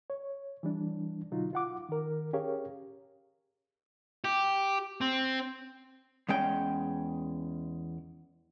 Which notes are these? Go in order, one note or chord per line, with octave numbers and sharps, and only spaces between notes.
C#5
E3 G3 D4
B2 D3 F#3 D#4 F4
F4 F#5 D6
D#3 A#4
C#4 G4 G#4 A#4 C#5 F5
G4
C4
E2 G#3 C#4 G5